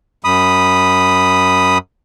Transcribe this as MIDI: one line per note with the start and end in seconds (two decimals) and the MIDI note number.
0.25 1.78 42
0.25 1.78 83
0.25 1.78 87